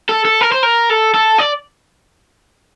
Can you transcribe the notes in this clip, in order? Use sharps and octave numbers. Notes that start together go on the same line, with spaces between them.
A4
A4
A#4
C5
A#4
A4
A4
D5